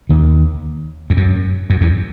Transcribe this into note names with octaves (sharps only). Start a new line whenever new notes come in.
D#2 D#3
E2
F#2
F#2
E2